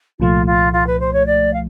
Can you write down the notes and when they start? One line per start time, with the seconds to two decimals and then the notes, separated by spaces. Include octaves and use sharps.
0.20 C2 A#2 F3 A3 F4
0.46 F4
0.73 F4
0.87 B4
1.00 C5
1.13 C#5
1.26 D5
1.53 F5